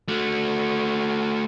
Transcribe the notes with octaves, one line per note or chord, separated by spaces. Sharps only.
A3 F#4